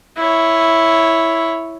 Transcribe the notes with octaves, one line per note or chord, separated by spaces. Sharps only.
E4 C#5